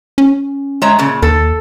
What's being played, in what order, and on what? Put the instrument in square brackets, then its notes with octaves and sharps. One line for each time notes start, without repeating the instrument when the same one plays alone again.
[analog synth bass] C#4
[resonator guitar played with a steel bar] G#3 C#5 A#5
A#2 C#3
[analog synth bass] D#2 [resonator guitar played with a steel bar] A4